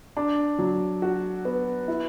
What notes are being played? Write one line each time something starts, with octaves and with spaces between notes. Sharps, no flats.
D4
F#3
F#4
B3
E4